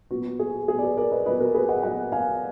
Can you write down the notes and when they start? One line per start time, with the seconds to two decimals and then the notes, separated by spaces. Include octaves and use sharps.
0.11 A#2 F#3 B3 F#4
0.40 G#4
0.68 A#2 F#3 B3 G#4
0.79 D5
0.82 G#4 B4
0.97 A#4 D5
1.11 B4 D#5
1.25 A#2 F#3 B3 B4 D#5
1.40 F#4 A#4
1.54 G#4 B4
1.69 D#5 F#5
1.83 A#2 F#3 B3 D#5 F#5
2.12 F5 G#5